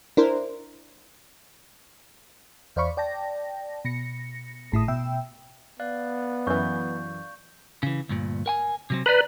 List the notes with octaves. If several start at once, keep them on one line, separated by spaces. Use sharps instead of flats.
D4 E4 A#4 C5
E2 C5 D5 F5 B5 C#6
D5 G5 A5 A#6
B2 A#6 C#7
G#1 A2 E4 D#6
B2 E5 G5 E6
B3 D5 F5 F#6
F#2 E3 C#6 G6
C#3 E3
D2 G2 A#2
A#4 G5 G#5
C3 F#3 C4
B4 D5 A#5